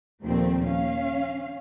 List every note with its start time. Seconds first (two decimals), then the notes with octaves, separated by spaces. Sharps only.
0.22 D#2 A#2 F3 A3 C4
0.64 C#4 F5